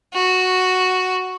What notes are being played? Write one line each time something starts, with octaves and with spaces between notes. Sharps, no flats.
F#4